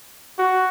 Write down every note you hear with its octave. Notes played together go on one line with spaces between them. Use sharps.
F#4